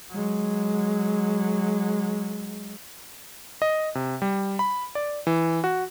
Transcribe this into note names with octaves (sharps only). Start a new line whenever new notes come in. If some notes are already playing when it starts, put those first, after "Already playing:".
F#3 G#3
D#5
C3
G3
B5
D5
E3
F#4